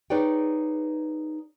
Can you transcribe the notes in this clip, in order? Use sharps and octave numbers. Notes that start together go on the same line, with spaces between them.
D#4 G#4 B4 C#5 D5 G5